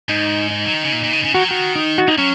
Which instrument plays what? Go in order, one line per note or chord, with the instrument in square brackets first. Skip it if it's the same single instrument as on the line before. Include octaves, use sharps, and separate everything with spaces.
[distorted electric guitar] G#2 [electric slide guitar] D#4
[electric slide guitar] D#4
[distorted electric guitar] F#3
D#3
C#3
A#2
A#2
C#3
C#3
[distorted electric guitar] D#3 [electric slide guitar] F#4
[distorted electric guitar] F#3
[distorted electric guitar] D#3 [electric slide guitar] F#4
[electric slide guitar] D#4
F#4
D#4
[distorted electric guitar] F#3 [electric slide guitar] C#4